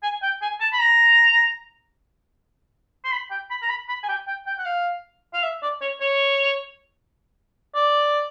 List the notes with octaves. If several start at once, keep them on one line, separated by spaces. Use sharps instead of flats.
G#5
G5
G#5
A5
B5
A#5
C6
B5
G5
B5
A#5
B5
B5
G#5
G5
G5
G5
F#5
F5
F5
E5
D5
C#5
C#5
D5